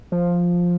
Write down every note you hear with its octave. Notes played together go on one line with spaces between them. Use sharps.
F3